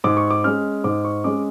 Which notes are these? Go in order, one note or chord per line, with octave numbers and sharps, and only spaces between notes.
G#2 D6
C#6
D6
G#3 C#4 F6
G#2 D6
C#6
G#3 C#4 D6